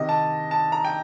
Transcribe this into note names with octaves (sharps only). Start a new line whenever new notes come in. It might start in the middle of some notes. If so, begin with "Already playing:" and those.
Already playing: C3 D#3 D#5
A5
A5
A#5
G5